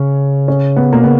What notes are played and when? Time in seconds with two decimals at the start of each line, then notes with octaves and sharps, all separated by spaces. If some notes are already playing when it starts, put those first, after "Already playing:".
Already playing: C#3 C#4
0.48 C#4
0.76 B3
0.93 B2 A#3
1.04 C#3 B3